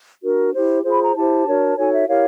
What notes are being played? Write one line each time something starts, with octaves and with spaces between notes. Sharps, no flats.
D4 F#4 A#4
E4 G4 C5
F4 G#4 C5
B5
A#5
E4 G4 C5 A5
D4 F#4 A#4 C#5
D#4 F#4 A4 C#5 G#5
E5
E4 G4 A#4 C#5 F5